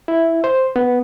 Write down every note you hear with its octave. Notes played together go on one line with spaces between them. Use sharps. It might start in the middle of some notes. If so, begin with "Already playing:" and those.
E4
C5
B3